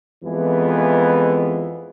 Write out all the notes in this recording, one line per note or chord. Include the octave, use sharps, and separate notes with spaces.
F2 E3 G#3 B3